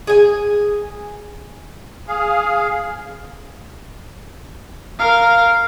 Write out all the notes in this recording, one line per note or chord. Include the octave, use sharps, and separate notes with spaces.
G#4 G#5
G#4 F5
A#4 F5